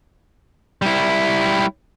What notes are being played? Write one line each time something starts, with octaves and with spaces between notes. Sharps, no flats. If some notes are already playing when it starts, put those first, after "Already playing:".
G3 E4